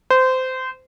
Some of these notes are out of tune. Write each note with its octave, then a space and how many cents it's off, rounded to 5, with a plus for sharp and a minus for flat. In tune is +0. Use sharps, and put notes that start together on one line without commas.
C5 -20